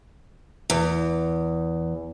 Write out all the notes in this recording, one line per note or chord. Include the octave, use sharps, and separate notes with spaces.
E2